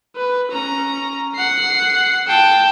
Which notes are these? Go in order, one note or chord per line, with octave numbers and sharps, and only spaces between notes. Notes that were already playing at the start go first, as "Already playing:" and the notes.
B4
C#4 A#5
F#5 C7
G5 A5